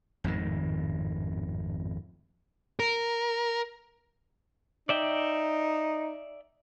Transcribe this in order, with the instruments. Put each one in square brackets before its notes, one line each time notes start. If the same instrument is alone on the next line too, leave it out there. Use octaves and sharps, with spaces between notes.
[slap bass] G#1 F2 A2 D#3
[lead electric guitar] A#4
[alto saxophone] D#4 [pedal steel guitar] D5 E5 G5